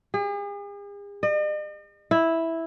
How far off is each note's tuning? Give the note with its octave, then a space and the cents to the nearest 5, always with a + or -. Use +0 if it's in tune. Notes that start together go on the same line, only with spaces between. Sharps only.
G#4 -45
D#5 -45
E4 -5